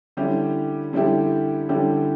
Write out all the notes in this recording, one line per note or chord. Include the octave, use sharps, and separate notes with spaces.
D3 G3 C#4 E4 G4
D3 G3 C#4 E4 G4
D3 G3 C#4 E4 G4